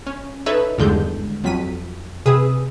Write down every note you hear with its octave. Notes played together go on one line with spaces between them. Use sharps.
C#4
D#4 A4 B4 C#5 E5
G#1 E2 G2 D3 G#3 G6
F2 F#3 B6 D#7
C3 G#4 B4 D#6 E6